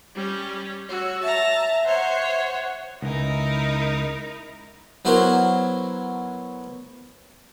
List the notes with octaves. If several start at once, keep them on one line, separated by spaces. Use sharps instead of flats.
G3 C#4
F#4 C#5 E6
E5 A5 A#5
C5 C#5 F#5
C#2 C#3 D#4 E4 A#4
F#3 B3 E4 F#4 A#4 C5